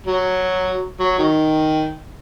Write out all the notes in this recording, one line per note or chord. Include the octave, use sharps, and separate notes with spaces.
F#3
F#3
D#3